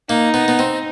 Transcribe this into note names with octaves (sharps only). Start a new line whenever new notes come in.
A#3 D#4
B3
B3
C4